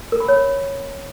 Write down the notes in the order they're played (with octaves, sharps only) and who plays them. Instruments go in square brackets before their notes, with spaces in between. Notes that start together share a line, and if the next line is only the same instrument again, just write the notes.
[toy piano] A#4
B5
C#5